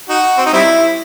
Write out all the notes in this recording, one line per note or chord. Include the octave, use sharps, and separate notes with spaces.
D#4 F#4
C4
D#4
G3 C4 E4